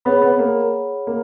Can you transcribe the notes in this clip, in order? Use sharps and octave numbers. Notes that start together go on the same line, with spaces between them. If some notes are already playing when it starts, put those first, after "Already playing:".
B3 G#4 C#5 F#5 B5
B3
A#3
A#3